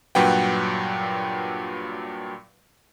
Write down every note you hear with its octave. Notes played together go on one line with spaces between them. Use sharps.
G2 A#2 F#3 B4 F#5 G5